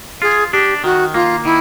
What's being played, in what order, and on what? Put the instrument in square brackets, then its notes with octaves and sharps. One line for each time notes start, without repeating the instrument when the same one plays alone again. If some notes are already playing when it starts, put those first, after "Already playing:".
[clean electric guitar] F4 [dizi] G#4
[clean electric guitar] D4 [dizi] G4
[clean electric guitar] D#3 [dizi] F#4
[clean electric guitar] A#3 [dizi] F4
[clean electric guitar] D#3 [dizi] E4